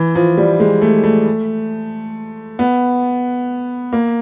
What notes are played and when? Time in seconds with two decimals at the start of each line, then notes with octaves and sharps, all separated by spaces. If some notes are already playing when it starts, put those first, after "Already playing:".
Already playing: E3
0.15 F3
0.38 G3
0.60 G#3
0.82 A3
1.04 A3
2.59 B3
3.93 A#3